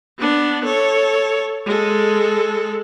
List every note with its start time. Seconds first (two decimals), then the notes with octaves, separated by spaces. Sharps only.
0.18 B3 D4
0.65 A4 C#5
1.66 G#3 A4